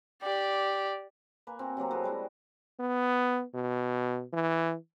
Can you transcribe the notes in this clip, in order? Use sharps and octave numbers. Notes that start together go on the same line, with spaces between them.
G4 D5
A#3 B4 G#5
C4 F#4
C3 F#3 A#3 C4
A3 F#4 G#4 B4
G3 G#3 E4
B3
B2
E3